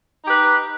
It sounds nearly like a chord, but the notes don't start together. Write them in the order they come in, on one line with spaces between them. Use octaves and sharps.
D#4 G4 B4